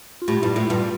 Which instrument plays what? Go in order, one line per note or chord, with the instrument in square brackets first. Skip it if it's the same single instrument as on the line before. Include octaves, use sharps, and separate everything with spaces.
[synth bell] F4
[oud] A2 [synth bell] G4
[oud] G2 [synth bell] E4
[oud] A2 [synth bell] F4
[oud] G2 [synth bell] F4